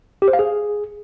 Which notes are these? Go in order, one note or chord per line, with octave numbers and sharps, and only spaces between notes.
G4
C5
F5
G#4